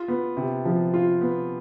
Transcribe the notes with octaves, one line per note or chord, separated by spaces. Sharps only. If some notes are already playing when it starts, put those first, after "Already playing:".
Already playing: F4
B3
C3
F3
F4
B3